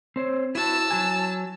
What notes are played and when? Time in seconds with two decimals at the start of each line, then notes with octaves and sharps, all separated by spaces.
0.16 C4 C5 C#5
0.55 E4 F#4 A5 E6
0.91 F#3 F#4 G#5